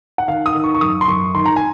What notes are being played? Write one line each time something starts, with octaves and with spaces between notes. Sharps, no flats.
F#5
D#3 F5
D#6
D#3
C#6
C#6
F#2 D#6
C6
F#2 C#6
D#3 C6
A#5
G#5